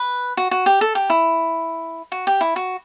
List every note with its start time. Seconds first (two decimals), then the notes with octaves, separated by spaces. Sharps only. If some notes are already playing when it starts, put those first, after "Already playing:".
Already playing: B4
0.37 F#4
0.51 F#4
0.66 G4
0.81 A4
0.95 G4
1.10 E4
2.12 F#4
2.27 G4
2.41 E4
2.56 F#4